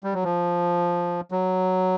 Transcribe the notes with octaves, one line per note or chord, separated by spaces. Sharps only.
G3
F#3
F3
F#3